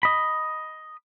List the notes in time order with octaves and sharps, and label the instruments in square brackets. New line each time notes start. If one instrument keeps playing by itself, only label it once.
[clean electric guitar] D#5 B5